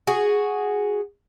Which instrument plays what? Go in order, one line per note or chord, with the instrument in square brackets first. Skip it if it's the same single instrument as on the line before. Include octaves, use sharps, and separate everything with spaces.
[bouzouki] F#4 G#4